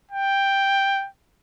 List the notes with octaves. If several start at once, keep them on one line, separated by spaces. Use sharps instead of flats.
G5